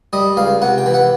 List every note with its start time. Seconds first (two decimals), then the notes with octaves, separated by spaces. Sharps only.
0.13 G3 D#5
0.37 C#2 F5
0.62 C3 F#5
0.78 G5
0.86 E3
0.94 F#5